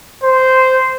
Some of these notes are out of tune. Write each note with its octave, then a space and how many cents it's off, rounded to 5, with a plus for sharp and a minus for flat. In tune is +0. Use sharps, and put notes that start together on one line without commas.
C5 -10